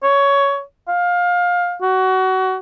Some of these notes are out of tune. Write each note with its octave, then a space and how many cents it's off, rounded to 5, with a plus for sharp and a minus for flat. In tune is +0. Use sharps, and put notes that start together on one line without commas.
C#5 +15
F5 +20
F#4 +25